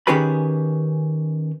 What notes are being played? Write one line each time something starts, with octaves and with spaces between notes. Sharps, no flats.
D#3 C#4 G4 G#4 B4 B5